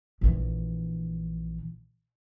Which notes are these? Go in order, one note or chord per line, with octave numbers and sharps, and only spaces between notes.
A#1 E3